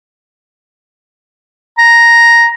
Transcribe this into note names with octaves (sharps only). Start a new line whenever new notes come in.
A#5